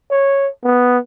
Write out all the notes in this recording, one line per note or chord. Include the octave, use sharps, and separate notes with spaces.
C#5
B3